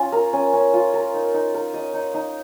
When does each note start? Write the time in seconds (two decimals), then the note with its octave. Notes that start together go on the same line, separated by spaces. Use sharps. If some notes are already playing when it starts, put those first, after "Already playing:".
Already playing: C#4 F4
0.12 A#4
0.33 C#4
0.53 C#4
0.74 F4
0.94 A#4
1.14 D#4
1.34 D#4
1.54 A#4
1.74 D#5
1.94 D#4
2.14 D#4